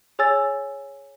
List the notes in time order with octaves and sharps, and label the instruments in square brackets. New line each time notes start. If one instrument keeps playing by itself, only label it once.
[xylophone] G#4 C#5 G#5 E6 A6